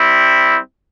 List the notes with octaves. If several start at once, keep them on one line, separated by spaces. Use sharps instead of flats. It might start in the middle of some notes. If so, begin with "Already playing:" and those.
Already playing: G3 C4 E4